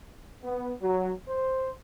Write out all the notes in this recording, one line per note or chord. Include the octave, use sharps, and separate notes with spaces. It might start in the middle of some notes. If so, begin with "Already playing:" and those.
B3
F#3
C5